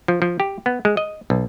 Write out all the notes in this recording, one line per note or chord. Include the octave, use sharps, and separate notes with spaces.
F3
F3
G4
B3
G#3
D#5
B1